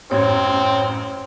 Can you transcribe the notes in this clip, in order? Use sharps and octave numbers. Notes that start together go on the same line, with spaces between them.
A1 F#2 C4 C#5 G#6